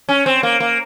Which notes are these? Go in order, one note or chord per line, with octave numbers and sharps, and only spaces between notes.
C#4
C4
A#3
A#3